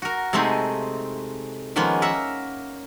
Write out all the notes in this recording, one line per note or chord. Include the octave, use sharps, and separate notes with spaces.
F#4 A#4
C3 G#3 A3 C4 D#4 G#4
D#3 F3 G#3 A#3 B3 C#4
A#4 E5 F#5